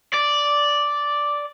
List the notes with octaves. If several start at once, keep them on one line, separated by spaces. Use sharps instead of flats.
D5